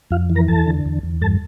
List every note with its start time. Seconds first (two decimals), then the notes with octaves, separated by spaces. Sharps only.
0.11 F2 F4 F5
0.30 E3
0.35 A#4 A#5
0.48 E2 A4 A5
0.66 D3
0.86 E2
1.03 E2
1.21 G2 A4 A5